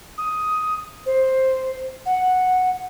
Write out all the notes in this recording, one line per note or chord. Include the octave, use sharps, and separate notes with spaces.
D#6
C5
F#5